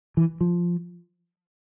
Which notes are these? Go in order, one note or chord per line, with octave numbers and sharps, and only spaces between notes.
E3
F3